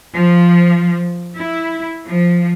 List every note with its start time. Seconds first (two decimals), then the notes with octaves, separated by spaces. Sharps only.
0.14 F3
1.36 E4
2.07 F3